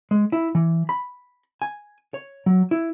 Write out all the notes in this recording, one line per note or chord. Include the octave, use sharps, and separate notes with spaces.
G#3
E4
E3
B5
G#5
C#5
F#3
E4